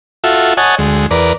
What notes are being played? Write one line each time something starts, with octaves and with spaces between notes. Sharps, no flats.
F4 F#4 A4 E5
C#5 D#5 F#5 G#5 A5
D2 G#3
E2 A#4 B4 D5